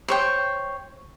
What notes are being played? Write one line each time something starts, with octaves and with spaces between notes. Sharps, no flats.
C5 C#5 G5